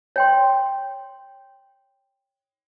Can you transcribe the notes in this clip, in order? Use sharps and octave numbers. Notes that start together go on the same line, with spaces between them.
C#5 G5 C6